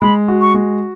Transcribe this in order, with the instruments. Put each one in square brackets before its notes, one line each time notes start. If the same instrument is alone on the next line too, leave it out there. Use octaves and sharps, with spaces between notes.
[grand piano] G#3 [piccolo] B5
[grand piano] F#4
[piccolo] C#6
[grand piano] G#3